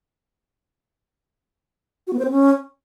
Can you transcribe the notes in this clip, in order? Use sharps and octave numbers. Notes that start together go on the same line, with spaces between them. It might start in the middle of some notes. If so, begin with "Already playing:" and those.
F#4
B3
C5
C4
C#4